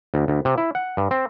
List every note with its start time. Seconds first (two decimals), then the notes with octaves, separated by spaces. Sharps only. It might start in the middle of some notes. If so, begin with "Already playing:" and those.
0.14 D2
0.28 D2
0.45 C3
0.58 E4
0.75 F#5
0.97 G2
1.11 C4